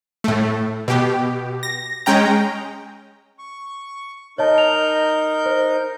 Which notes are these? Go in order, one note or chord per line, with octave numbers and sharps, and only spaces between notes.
A2 A3
B2 G4
A#6
G#3 C#4 G5 A#5
C#6
D#4 A#4 C#5 D#5 A5 G6
F7
C5